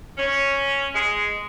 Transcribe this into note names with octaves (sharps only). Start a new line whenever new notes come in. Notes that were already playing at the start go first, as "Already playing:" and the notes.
C#4
G#3